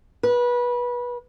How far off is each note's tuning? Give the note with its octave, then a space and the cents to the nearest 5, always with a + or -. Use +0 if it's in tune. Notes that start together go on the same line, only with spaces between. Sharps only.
B4 -25